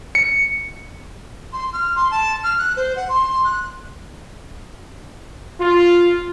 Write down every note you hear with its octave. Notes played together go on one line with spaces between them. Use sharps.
C#7
C6
F6
C6
A5
F6
F#6
C5
F#5
C6
F#6
F4